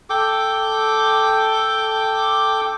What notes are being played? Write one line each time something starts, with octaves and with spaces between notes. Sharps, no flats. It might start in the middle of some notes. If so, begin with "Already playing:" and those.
A4 G5 D6